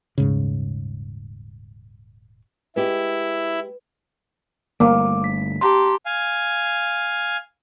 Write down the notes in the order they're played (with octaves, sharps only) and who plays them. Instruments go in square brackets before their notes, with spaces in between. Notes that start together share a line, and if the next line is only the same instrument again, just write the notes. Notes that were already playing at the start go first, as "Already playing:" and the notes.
[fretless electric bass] D#1 G#2 C#3
[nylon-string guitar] G#3 G4 [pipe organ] E4 [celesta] B4
[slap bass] G1 G3 A3 [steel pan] A#3 [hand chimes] D6
[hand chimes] B6
[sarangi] G4 [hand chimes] A5 A#5 C6
[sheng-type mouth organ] F5 G#5